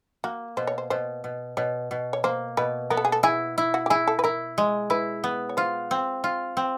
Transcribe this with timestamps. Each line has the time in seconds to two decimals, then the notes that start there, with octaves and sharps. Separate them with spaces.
0.24 A#3 F#4
0.57 B2 C5
0.67 C#5
0.78 C5
0.90 B2 C5
1.24 B2
1.57 B2 C#5
1.91 B2
2.13 C#5
2.24 A#3 C5
2.57 B2 B4
2.90 B3 A#4
2.97 A4
3.05 G#4
3.12 A4
3.23 E4 G#4
3.58 E4
3.74 F#4
3.86 G4
3.90 E4 G#4
4.08 A4
4.19 B4
4.24 E4 A#4
4.58 G#3
4.90 E4 B4
5.24 B3
5.49 C#5
5.57 F4 C5
5.91 C4
6.24 F4
6.57 C4